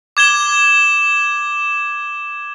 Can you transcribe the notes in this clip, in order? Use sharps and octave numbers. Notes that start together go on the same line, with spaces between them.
D6 G#6 E7 G7